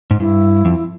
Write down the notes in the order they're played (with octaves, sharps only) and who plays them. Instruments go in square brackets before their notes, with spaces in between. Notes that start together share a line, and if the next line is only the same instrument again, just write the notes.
[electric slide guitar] G#2
[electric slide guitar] G2 [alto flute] E4
[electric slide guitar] F2